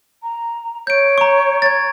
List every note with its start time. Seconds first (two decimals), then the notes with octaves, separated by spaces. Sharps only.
0.22 A#5
0.87 C#5 G6 D7
1.18 A#5 C#6
1.62 G#6 A6